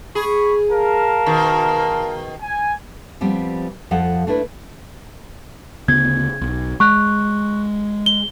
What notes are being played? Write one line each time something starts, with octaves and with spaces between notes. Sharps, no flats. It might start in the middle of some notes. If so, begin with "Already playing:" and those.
G#4 B5 C#6
A#4 F5 A5
B2 D#3
G#5
F3 G3 B3 C4
F2 F3 A4 F#5
A3 D4 E4 B4
D2 C#3 B3 G#6
B1
G#3 C#6 F#6
G7